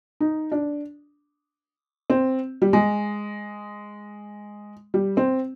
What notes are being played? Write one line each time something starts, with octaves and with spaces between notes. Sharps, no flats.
D#4
D4
C4
G3
G#3
G3
C4